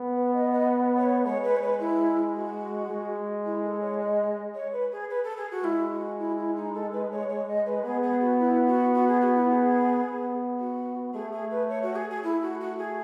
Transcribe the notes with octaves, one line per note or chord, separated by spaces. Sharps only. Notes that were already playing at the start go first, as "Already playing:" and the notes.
Already playing: B3
B4
D#5
D#5
C#5
G#3 C#5
B4
C#5
B4
E4
F#4
G#3
E4
A4
C#5
D#5
C#5
B4
G#4
B4
A4
G#4
F#4
G#3 E4
F#4
E4
E4
D#4
A4
B4
C#5
C#5
D#5
B4
B3 G#4
G#4
F#4
E4
F#4
F#4
G#4
F#4
E4
G#4
B3
F#4
A3 G#4
G#4
B4
C#5
F#4
G#4
G#4
A3 E4
F#4
F#4
G#4